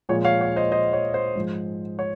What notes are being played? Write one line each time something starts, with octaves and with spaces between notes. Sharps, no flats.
A#2 F3 G#3 C#5
C#5 F5
C#5
C5 D#5
C5 D#5
C#5
C5
G#2 F3 G#3
C#5